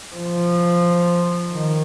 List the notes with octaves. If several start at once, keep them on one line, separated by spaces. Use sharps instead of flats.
F3
D#3